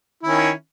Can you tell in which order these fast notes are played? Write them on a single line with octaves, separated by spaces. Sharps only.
E4 D#3 C#4